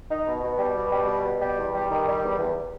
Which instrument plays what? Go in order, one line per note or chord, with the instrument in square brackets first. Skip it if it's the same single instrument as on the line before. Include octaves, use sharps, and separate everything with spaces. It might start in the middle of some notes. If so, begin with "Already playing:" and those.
[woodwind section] D#4
B2
B2
G3
B2
G3
B2
B2
G3
E2
G3
D#3
G3
E2
E2